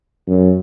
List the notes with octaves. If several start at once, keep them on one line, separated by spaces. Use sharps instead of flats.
F#2